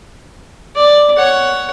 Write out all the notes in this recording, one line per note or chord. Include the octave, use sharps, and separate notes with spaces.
D5
C#5 F#5